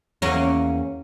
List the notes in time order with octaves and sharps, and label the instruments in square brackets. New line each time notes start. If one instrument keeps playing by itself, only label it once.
[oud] E2 A#3 C#4